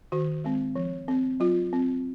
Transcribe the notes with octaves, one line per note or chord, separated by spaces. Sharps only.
D#3 F#4
G#3 C4
F3
C4
F#3 F4
C4